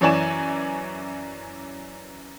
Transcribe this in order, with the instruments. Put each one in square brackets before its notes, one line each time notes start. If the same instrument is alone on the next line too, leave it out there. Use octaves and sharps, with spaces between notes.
[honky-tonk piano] F#2 E3 C#5 D5 G#5 E7